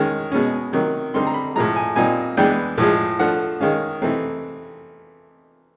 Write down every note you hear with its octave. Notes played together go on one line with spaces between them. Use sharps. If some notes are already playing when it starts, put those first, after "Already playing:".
Already playing: D#3 G#3 C#4
B2 G#3 C#4
C3 D#3 F#3 A#3
D3 G3 C4 D#4 C6
A#5
B5
A2 F3 G#3 A#5
G#5
A#2 G3 C4 D#4 G#5
E3 G#3 B3 D4 G5
A2 F3 G#3
F3 A3 D4 F#5
D#3 G#3 C#4 F5
C3 E3 A3 C4 D#4